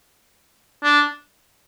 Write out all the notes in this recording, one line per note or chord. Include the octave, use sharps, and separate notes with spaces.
D4